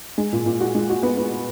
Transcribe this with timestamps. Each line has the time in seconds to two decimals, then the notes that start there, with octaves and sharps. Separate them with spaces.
0.18 G#3
0.32 A#2
0.46 A#2
0.60 F#4
0.75 G#3
0.90 F#4
1.03 B3
1.17 B3